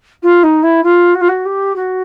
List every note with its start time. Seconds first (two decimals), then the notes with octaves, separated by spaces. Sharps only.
0.22 F4
0.43 D#4
0.63 E4
0.83 F4
1.14 F#4
1.21 F4
1.28 F#4
1.45 G4
1.75 F#4